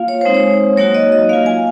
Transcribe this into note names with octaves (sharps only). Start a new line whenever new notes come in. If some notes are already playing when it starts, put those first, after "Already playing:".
Already playing: A#3 F4 F5
C#5
G#3 C4 D#4 C5
C#5
F#3 A#3 D#4 F#4 C#5
D#5
D#5
A#3 F4 F5
G#5